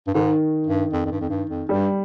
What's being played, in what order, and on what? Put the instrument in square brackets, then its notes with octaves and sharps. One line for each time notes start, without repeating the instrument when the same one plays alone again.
[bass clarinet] G2
[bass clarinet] G#2 [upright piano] D#3
[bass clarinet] G2
F2
F2
G2
F2
G2
F2
[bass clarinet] G2 [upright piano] G3